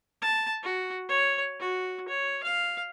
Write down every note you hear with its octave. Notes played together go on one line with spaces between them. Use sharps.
A5
F#4
C#5
F#4
C#5
F5